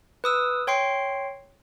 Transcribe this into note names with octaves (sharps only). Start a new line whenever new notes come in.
B4 D#6 E6
C#5 G5 C6 C7